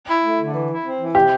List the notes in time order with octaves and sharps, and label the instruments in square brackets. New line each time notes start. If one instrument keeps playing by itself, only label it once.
[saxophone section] E4
A3
D3
E3
E4
C4
E3
[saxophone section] C3 [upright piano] G4